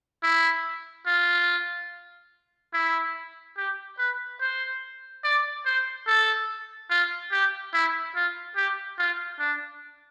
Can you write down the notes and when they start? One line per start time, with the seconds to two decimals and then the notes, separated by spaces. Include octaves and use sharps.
0.23 E4
1.07 F4
2.74 E4
3.57 G4
3.98 B4
4.41 C5
5.24 D5
5.66 C5
6.07 A4
6.90 F4
7.32 G4
7.74 E4
8.16 F4
8.56 G4
8.99 F4
9.40 D4